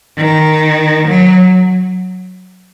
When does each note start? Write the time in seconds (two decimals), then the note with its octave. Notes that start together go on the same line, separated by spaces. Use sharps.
0.17 D#3
1.08 F#3